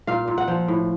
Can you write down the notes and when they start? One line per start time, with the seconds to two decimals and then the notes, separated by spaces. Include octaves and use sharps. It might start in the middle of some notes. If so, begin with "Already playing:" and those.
0.07 A#2 F5
0.28 A#2
0.38 F#5
0.48 F3
0.68 A2